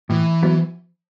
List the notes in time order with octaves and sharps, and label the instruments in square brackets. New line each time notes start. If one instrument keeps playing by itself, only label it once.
[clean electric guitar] A2 [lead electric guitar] E3
[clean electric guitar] F#3 B3 E4